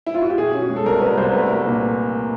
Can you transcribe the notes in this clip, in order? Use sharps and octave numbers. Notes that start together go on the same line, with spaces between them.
E4
F4
F#4
G4
B2 G#4
C#4
F#4
G#3
A4
C2 A#4
B2 B4
C2 C5
A3 B4
A3 A#4
A#2